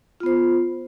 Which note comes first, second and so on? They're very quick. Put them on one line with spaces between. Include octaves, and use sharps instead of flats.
F4 B3 C5